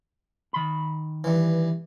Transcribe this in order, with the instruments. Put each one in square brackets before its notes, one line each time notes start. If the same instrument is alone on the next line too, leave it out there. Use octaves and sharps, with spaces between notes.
[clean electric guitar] D#3 B5
[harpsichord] G2 E3